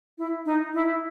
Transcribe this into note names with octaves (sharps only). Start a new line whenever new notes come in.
E4
D#4
E4